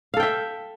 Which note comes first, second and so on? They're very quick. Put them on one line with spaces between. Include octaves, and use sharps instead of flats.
F5 A4 G5 E5